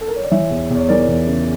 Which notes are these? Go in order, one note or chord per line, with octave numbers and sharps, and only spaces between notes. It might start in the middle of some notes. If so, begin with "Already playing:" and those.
A4
A#4
C#5
D5
E3 C#5 E5
E2
E2
C#5
E3 A#4 D5
E2
C#3